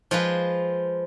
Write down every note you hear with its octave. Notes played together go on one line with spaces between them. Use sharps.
F3 G#3 F4 B4